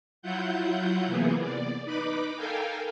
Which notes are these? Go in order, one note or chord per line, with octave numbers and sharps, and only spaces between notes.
F#3 E4 F4 F#5 G6
C3 E3 A#3 B3 G#4
D5
D#4 B4 B5 D6
A4 A#4 F5 G5 G#5